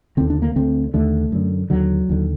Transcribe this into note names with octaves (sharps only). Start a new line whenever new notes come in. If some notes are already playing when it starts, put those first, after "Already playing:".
D#2 D3 C4
D4
A#3
D2 D3 C4
D#2 D3 A3
F#2 D3
D#2 D3 F#3
D#2 D3